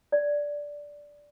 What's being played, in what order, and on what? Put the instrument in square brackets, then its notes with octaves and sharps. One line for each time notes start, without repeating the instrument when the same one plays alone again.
[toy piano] D5